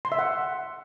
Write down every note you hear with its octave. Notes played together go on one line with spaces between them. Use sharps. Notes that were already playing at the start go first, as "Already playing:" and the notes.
C6
E5
F#5